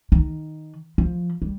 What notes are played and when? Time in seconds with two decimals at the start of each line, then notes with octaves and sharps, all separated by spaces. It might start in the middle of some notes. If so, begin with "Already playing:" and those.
0.12 D#3
0.98 F3
1.42 G3